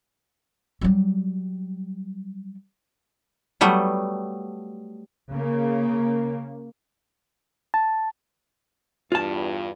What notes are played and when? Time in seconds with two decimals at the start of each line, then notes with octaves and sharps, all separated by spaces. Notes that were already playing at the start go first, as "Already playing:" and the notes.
0.81 F#3 G3
3.61 F#3 G3 A3 B3
5.30 C#3 A#3
7.74 A5
9.12 E2 G2 F4 A5